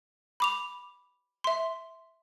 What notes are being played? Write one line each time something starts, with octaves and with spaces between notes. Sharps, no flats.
B5 D6 F7
E5 C6